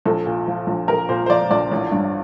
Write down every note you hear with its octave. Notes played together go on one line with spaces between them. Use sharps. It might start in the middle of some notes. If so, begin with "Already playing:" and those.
A#1 A4
A#2
F3
A#1
A#1 A#4
A#2 C5
C5
F3 D5
A#1 D5
A1
G2